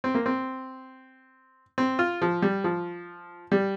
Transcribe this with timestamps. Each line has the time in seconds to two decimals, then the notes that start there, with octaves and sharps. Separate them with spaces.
0.04 C4
0.15 A#3
0.26 C4
1.78 C4
1.99 F4
2.22 F3
2.42 G3
2.64 F3
3.52 G3